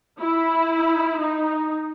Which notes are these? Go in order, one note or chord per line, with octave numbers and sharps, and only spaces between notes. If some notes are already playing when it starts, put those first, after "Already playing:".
E4
D#4